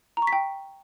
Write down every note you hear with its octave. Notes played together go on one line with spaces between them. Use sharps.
A#5
C#6
B6
G5